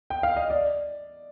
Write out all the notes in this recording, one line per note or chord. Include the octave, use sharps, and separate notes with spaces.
G5
F5
D#5
D5